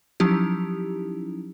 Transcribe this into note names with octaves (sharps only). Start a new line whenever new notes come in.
F3 F#3 C#4 D#4 E4 G4